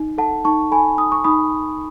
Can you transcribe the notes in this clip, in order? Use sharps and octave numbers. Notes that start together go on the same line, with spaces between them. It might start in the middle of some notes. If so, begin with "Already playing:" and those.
Already playing: D#4
A4 F#5 A5
D#4 A5 C#6
A4 G#5 B5
D#4 D#6
C#6
D#4 B5 D#6